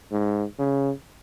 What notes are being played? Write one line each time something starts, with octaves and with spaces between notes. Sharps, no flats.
G#2
C#3